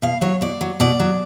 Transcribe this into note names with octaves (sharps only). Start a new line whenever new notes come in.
B2 F5
F#3 C#5
B2 D5
F#3
B2 D5
F#3